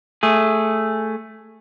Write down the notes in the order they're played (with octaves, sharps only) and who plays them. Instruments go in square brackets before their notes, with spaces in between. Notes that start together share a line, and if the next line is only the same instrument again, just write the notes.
[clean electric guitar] A3 G#4